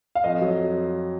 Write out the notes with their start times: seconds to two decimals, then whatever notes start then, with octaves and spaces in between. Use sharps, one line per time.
0.15 F5
0.24 F2 D#5
0.41 F#3